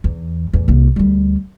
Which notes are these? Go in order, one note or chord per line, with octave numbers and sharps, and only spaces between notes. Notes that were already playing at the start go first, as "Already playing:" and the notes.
E2
E2 A2
C2 A#3
D2 G3